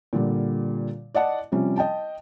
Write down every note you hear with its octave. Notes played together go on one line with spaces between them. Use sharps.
A#2 D3 G3
D5 D#5 F#5 A5
C3 F3 G3 C#4
D#5 G5 A5